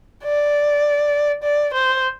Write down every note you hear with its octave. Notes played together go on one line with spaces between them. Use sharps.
D5
D5
C5